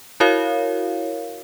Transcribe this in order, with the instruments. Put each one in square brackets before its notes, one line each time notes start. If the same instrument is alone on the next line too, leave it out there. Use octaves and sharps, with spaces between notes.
[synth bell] E4 F#4 A#4 C#5 F5